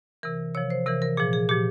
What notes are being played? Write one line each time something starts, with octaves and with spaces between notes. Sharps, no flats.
C3 E3 A#4
C3 F3 C#5
C5
C3 E3 A#4
A#4
A#2 F3 G#4
G#4
A#2 F3 G4